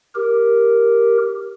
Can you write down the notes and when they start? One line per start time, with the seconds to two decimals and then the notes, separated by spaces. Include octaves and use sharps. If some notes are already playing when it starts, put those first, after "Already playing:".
0.15 G4 A#4